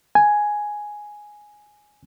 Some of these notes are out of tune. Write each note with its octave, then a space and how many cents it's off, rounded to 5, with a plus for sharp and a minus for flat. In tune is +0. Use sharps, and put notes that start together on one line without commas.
G#5 +5